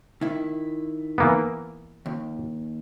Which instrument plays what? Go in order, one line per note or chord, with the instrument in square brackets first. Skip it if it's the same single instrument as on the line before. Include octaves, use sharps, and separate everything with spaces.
[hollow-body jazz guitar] D#3 E4
[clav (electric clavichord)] E3 A#3 B3
[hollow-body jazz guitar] D#2